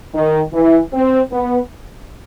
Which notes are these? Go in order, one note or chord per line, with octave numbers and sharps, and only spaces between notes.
D#3
E3
C4
B3